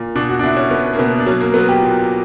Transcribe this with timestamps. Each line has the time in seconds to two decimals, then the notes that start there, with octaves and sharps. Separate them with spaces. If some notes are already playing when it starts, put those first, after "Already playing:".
Already playing: A#2
0.16 B2 D4
0.29 F#4
0.39 D4
0.43 B2 E4
0.57 C#4
0.71 B2 B3
0.93 A#3
0.99 B2 B3
1.18 D4
1.26 F#3 C#4
1.40 A#3
1.54 F#3 B3
1.69 G4
1.82 A#2